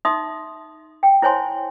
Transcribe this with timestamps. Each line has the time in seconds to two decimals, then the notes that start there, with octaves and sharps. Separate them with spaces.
0.05 D#4 E5 C6 D#6
1.03 G5
1.22 E4 C5 C#5 G#5 C6